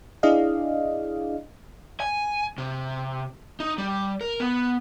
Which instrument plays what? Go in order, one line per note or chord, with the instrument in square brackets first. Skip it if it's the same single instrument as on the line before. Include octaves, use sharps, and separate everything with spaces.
[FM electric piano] D4 E4 G#4 D5 D#5 F5
[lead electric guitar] G#5
C3
D#4
G3
A#4
B3